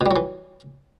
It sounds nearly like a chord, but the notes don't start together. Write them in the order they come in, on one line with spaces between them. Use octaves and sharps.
B2 G3 F#3 E3